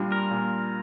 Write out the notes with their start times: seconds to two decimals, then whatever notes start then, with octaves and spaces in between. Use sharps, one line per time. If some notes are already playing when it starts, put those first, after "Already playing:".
Already playing: A#2 G3 D4 F4
0.12 A#4
0.31 A#2